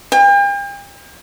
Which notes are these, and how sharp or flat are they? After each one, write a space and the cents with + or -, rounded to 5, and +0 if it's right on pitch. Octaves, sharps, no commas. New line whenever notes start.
G5 +40